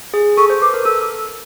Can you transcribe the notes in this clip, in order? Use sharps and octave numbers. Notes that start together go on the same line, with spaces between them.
G#4
A4 C#6
C5
B4 D6
A#4
A4 E6